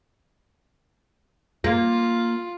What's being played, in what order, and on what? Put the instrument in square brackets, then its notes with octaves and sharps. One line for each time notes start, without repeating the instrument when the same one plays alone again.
[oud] A#3 [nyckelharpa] F4